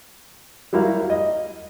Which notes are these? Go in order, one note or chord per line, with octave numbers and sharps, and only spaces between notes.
F#3 G3 E4 F#4 A#4 F5
D#5